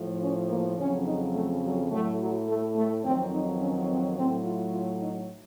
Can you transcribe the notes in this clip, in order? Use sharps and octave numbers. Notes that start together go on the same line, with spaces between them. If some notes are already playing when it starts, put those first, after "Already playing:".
Already playing: A2 F3
C#4
A#3
F2 C#3 F#3 C#4
D#4
A3
F#3
A2 F#3 A3
F#3
A3
A3
F2 D#3 F#3 C4
D#4
C#4
C4
A2 F#3 C4
F4
F4
D#4